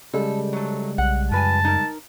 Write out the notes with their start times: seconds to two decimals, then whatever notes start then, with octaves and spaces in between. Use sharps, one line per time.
0.14 C#3 G3 G#3 A4
0.53 F#3 A3
0.98 B1 F#5
1.32 F#2 F3 B4 G#5 A5
1.65 D#4 A#4